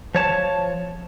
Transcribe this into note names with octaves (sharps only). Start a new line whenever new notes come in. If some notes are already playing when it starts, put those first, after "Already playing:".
F3 C#5 A5